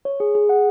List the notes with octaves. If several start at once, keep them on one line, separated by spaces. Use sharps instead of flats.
C#5
G#4
G#4
F#5